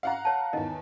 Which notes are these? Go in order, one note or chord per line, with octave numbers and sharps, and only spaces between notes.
F5 F#5 A#5
C#5 A5
E2 D#3 D#5